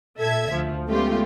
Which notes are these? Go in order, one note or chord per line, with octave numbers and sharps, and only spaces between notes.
A#2 A4 E5 G#6
D2 F3
G#3 A3 B3 C#4 F4 G4